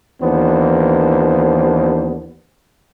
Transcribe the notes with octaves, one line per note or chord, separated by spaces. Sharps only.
D#2 E3 B3 D4 C5